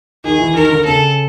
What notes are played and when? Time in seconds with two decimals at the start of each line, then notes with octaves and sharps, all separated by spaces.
0.24 D#3 G#4
0.39 E3
0.54 D#3 A#4
0.70 D3
0.84 C#3 A4